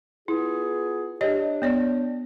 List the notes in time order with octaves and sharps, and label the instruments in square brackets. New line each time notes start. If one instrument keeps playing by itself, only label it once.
[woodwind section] B3 F4 G#4 [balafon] E4
[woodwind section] D4 [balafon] G4 C#5 D#5
[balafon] B3 C#5 D5